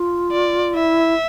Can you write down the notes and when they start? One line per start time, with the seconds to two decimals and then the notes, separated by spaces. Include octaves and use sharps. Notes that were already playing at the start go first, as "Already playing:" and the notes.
Already playing: F4
0.32 D5
0.74 E4 E5